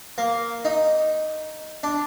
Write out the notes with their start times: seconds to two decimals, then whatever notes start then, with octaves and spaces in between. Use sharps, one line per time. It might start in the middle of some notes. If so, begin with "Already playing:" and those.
0.18 A#3
0.65 D#4
1.83 D4